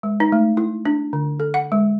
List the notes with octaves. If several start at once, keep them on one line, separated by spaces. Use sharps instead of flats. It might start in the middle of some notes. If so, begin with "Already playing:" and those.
G#3
D#4
A3
E4
D4
D3
A4
F#5
G#3